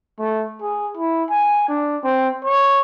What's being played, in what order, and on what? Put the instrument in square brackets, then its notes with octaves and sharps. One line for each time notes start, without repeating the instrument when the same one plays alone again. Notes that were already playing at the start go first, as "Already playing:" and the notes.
[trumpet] A3
G#4
E4
G#5
D4
C4
C#5